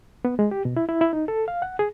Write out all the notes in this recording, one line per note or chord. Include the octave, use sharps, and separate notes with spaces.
B3
G#3
G4
B2
E4
E4
E4
D#4
A4
F5
F#5
G#4